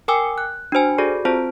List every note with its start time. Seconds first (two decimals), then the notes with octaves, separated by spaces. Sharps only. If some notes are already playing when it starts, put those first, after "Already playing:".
0.08 A#4 G5 G#5 D6 E6 C#7
0.38 F#6
0.72 D4 F#4 C5 G#5
0.98 F#4 G#4 A4 D5
1.25 C4 F4 C5 A5